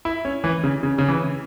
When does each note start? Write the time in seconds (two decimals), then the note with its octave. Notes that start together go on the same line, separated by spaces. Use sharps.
0.05 E4
0.25 C#4
0.44 E3
0.64 C#3
0.83 C#3
0.98 C#3
1.08 E3